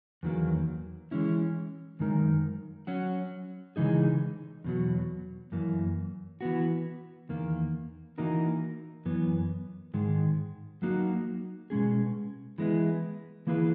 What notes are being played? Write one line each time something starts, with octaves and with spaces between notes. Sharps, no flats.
E2 D#3 F#3 A#3
E3 G#3 C#4 E4
F#2 D#3 G#3 D#4 A#4
F#3 C#4 F#4
C#3 E3 G#3 D#4 G#4
E2 B2 F#3
F#2 E3 A#3
E3 B3 F#4
E2 D#3 A#3
E3 A#3 D#4 F#4 A#4
F#2 E3 B3
G#2 D#3 G#3
F#3 A#3 D#4 F#4
B2 G#3 C#4 G#4
E3 G#3 B3 E4
E3 A#3 E4 G#4 B4